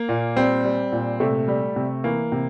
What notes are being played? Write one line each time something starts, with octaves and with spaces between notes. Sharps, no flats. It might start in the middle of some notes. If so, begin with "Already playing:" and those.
Already playing: A#3
A#2
G3 C4
G3
A#2
C3 A3
G3
C3
E3 A#3
C3